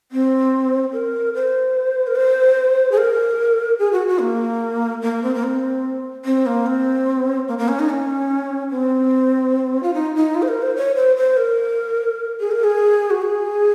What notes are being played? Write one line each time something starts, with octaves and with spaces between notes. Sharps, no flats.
C4
A#4
C5
A#4
C5
G#4
A#4
G#4
F#4
F#4
A#3
A#3
C4
A#3
C4
C4
A#3
C4
A#3
A#3
C#4
D#4
C#4
C4
F4
D#4
D#4
F4
C5
A#4
C5
C#5
C5
C5
A#4
G#4
A#4
G#4
F#4
G#4